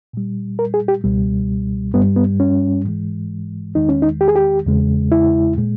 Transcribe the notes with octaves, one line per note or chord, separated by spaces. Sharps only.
A#2 G3
A#4
G#4
G4
C#2 B2 G3
G2 G3 B3
B3
C#4
G#2 E3 G#3
E2 D#3 G#3 D#4
C#4
D#4
G4
G#4
G4
E2 C#3 G#3
E4
A#2 G#3